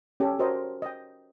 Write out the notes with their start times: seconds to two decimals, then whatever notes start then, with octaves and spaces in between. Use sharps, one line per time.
0.20 C#4 G4 A4
0.39 F#4 A#4 C5 C#5 D#5
0.82 D#5 G5